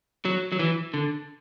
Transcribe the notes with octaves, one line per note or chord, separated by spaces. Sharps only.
F#3
F#3
E3
D3